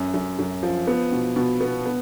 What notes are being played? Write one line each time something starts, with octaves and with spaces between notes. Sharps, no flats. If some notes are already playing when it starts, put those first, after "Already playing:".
Already playing: F#2
F#2
F#2
F3
B3
B2
B2
B3
B3